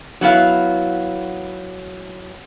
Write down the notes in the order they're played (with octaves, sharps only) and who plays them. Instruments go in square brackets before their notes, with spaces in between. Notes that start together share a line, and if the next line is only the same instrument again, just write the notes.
[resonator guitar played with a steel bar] F#3 B3 E4 F5